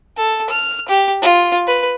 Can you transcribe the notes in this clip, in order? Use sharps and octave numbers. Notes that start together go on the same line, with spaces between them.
A4
F6
G4
F4
B4